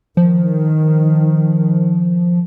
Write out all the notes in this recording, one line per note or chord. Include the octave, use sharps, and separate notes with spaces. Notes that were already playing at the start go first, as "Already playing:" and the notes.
D#3 F3